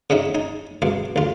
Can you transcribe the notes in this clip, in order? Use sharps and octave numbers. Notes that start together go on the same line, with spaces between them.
C#3 C#4 D#4 E4
D#4 G#5
C#2 B2 F5
D2 F4